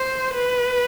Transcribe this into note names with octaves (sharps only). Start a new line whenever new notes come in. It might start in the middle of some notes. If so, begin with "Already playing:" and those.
Already playing: C5
B4